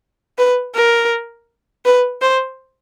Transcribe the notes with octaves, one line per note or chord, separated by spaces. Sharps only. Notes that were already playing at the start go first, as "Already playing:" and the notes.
B4
A#4
B4
C5